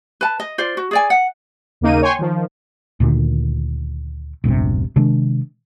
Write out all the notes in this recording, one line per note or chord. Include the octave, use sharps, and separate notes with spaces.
B4 A5
D#5
F4 C5 D5
F#4
G#4 D5 G#5
F#5
D#2 C#3 A#3 D#4 D#7
C#5 G5 G#5 C6 C#6
D#3 F3
D2 A#2 D3 D#3
E1 A#1 G2 C3
C3 D#3 G#3 D4